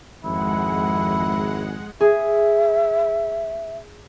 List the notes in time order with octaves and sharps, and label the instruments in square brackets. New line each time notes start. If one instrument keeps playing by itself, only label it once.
[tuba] G#1 [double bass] F2 [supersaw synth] G#3 F#5 [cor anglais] E4
[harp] G#4 [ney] E5